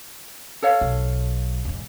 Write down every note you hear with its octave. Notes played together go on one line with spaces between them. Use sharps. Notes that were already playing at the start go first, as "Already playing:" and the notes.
A4 C#5 F5
B1
E2 G#2